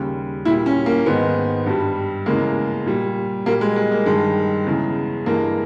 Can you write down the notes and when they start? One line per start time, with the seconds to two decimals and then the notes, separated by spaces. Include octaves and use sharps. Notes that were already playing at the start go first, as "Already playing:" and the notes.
Already playing: D#2 C#3 G3
0.45 A#2 G3 E4
0.66 C#4
0.86 A#3
1.06 G#2 D#3 G#3 B3
1.66 G2 G3
2.26 E2 C#3 G#3 A#3
2.86 A#2 G3
3.46 A#2 G3 A#3
3.61 G#3
3.76 G#3
3.92 A#3
4.06 G2 D#3 G3 G#3
4.67 E2 C#3 G#3
5.26 G2 E3 G#3 A#3